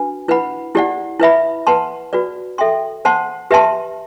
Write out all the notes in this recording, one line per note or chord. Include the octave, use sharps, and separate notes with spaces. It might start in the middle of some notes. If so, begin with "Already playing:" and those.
Already playing: D4 F#4 B4
E4 B4 F#5 B5
E4 G4 D5 F#5
E4 B4 E5 B5
B4 F#5 A5 C6
F#4 B4 D5
A4 E5 G5 C6
C5 F#5 A5 C6
G4 B4 E5 A5 C6